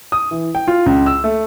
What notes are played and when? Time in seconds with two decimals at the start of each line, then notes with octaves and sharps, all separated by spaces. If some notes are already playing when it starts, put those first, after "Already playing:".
0.12 D#6
0.31 E3
0.55 G5
0.68 F4
0.86 C#2
1.06 E6
1.24 A3